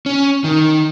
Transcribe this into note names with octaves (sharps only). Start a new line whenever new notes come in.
C#4
D#3